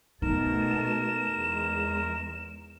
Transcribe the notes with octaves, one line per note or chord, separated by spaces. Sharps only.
B2 A3 D#4 A4 A#4 E7
E2 G#3